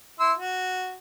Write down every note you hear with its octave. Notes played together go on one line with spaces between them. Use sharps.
E4 C6 E6
F#4